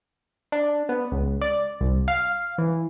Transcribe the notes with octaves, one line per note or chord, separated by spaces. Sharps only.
D4
B3
C#2
D5
C2
F5
E3